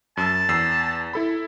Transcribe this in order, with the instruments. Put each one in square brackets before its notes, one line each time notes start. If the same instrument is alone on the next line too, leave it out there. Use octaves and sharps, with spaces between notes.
[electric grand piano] F#2 E6 [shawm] A5
[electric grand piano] E2 E6 C7
E4 A4 B5